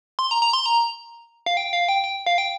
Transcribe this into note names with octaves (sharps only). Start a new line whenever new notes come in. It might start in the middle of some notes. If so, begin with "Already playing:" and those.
C6
A#5
A#5
C6
A#5
F5
G5
F5
G5
G5
F5
G5